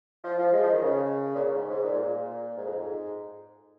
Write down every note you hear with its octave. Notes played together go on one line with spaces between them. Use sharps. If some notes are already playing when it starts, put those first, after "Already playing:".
F3
F3
G#3
F3
D#3
C#3
A#2
C#3
G#2
G#2
A#2
G#2
A#2
G#2
F2
G#2